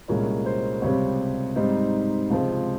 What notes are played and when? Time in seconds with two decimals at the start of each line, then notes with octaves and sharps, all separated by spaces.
0.08 C2 A#2 G#3 C#4 A#4
0.46 C5
0.82 C#2 C3 G3 C4 C#5
1.56 G#2 G3 C4 D#4
2.30 C#2 C3 F3 G#3 C4